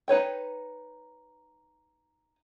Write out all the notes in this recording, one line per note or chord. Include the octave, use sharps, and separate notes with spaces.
D#4 B4 C#5 G5